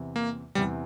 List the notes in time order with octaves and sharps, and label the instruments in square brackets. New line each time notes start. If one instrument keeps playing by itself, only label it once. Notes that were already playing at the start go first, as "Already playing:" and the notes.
Already playing: [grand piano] E2 C3 E3
[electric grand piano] A#3
[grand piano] E2 C3 E3 [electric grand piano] G3